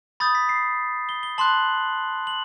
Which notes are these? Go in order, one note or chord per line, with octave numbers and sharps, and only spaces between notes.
B5 D#6 G6 A6
B6
C7
G7
G7
A5 C6 F#6 F#7
F#7